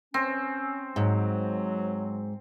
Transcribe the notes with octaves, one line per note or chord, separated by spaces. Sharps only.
C4 C#4
G#2 F#3